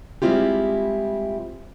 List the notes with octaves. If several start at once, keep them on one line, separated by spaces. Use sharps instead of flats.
G3 G#3 C4 E4 F4 G4